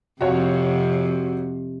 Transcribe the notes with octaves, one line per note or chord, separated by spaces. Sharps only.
F2 C3 F#4 C#5 F5